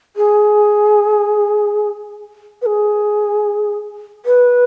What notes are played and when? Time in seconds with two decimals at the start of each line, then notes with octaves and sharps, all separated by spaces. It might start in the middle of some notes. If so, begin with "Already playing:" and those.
0.16 G#4
2.62 B4
2.66 G#4
4.26 B4